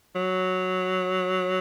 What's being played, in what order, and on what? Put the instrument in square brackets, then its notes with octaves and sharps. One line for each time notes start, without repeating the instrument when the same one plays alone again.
[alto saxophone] F#3